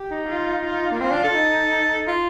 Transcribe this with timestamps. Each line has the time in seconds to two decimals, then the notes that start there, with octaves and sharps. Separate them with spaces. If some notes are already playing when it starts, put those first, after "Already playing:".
Already playing: G4
0.11 D#4
0.29 F4
0.64 F4
0.92 A#3
1.00 C4 F4
1.12 D4
1.24 A4
1.36 D#4
2.08 F4